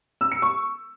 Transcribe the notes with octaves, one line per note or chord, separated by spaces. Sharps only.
E6
C#7
C#6